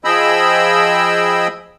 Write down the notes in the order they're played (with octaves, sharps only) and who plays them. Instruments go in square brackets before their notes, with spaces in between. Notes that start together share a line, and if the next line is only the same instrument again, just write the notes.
[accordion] F3 G#4 D#5 G5 B5 E6